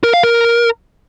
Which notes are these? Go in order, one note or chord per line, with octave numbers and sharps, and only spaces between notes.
A#4
F5
A#4